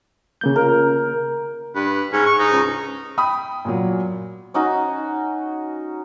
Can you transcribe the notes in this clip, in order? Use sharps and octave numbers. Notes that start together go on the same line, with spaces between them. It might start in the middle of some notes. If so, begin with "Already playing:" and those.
C#3 A#3 G6
A#4
G2 B4
G#2 C#4
C#6
G#2 D#4
C#2
G5 B5 D#6
A#2 F#3
C#4 D#4 F#4 D#5